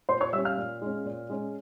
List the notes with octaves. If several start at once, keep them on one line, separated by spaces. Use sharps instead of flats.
A#2 C5 C6
C#5 C#6
G3 C#4 E5 E6
F5 F6
A#2
G#3 C#4
A#2
G#3 C#4